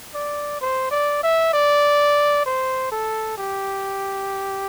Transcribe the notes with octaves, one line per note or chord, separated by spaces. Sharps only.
D5
C5
D5
E5
D5
C5
A4
G4